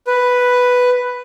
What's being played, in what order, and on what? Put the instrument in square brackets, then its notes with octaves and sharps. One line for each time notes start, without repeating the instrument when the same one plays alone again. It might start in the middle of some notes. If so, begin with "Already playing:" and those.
[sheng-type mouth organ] B4